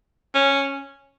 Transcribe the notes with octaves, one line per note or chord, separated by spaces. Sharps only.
C#4